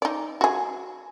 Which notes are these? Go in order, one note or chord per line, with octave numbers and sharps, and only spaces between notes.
D#4 D5
F#4 G#4